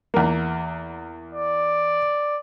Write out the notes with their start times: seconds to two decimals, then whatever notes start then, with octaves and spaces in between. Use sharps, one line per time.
0.14 E2 A#3
1.33 D5